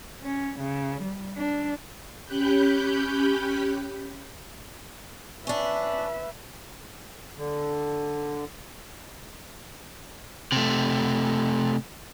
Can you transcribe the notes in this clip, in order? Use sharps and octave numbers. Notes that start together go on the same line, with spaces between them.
C#4
C#3
G3
D4
C#4 G4 B5 F#6 G6
C#4 D4 B4 E5
D3
C3 A3